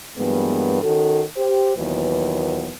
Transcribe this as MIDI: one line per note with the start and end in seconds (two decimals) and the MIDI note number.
0.17 0.80 43
0.17 0.80 52
0.17 0.80 54
0.17 0.80 56
0.17 0.80 58
0.17 0.80 59
0.82 1.23 51
0.82 1.23 61
0.82 1.23 66
0.82 1.23 69
1.36 1.73 67
1.36 1.73 72
1.76 2.71 39
1.76 2.71 46
1.76 2.71 52
1.76 2.71 54
1.76 2.71 59
1.76 2.71 71